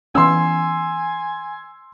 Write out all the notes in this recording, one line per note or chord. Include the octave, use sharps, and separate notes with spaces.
E3 B3 C#4 G#5 C6 E6